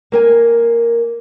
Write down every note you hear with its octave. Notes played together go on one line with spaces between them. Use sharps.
A#3 A#4 G#5